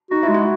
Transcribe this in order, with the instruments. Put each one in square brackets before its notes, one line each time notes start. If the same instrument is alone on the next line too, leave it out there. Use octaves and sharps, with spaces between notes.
[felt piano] D#4 [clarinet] F#4
[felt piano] E4
[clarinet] G#3
[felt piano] F#4